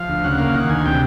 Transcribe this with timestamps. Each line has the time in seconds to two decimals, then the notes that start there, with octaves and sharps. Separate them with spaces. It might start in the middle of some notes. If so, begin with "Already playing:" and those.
Already playing: F3 F5
0.09 D2
0.24 C#3 F#5
0.38 A#3 F5
0.54 D#3 F#5
0.69 D2 G#5
0.85 C3 G5